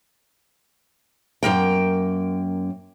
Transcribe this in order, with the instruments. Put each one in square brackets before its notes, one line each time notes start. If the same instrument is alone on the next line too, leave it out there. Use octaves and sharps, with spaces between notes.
[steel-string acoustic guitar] F#2 E3 A#3 G5